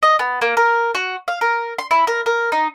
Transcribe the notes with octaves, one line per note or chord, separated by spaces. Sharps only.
D#5
B3
A#3
A#4
F#4
F5
A#4
C6
E4
A#4
A#4
D#4